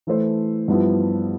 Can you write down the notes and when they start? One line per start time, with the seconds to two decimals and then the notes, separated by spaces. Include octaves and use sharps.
0.07 E3 A3 E4 A4 C5
0.68 G2 F3 B3 E4